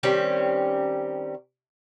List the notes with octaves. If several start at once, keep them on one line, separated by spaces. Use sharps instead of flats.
D#3 G3 C4 C#4